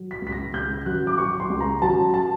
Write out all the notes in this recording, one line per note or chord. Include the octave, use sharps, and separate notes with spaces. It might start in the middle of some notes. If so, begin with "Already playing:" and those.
Already playing: F#3
B6
C#2 B6
A#6
C#2 G6
F#3 F#6
D6
F#3 C#6
C6
C#2
A#5
F#3 A5
A5